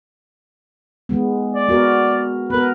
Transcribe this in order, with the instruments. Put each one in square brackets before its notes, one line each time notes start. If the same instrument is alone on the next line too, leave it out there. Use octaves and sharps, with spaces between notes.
[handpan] D#3 G#3 B3
[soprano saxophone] D5
[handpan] B3 F#4 A#4
[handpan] B3 A#4 [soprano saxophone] B4